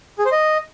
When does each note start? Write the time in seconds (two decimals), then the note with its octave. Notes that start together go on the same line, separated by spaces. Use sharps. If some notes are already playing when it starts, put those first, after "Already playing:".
0.19 G#4
0.25 C5
0.32 D#5